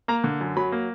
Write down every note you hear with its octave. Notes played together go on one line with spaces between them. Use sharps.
A#3 A#5
D3
F#2
F#3 B5
A#3